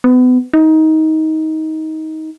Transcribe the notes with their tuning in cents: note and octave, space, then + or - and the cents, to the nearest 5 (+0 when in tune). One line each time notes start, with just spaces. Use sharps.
B3 +30
D#4 +20